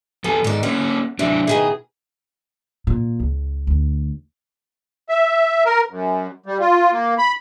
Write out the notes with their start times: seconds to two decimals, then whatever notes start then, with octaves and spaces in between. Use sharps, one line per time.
0.24 E2 B3 A4 G#5
0.44 G#2 D#3 D5
0.63 A#3 C#4 F#5
1.19 C3 E3 F#3 D4
1.47 B2 D#3 E3 G#4
2.87 A#2
3.20 C#2
3.67 D2
5.09 E5
5.65 A#4
5.90 F#2
6.46 G3
6.60 F4
6.92 A#3
7.18 B5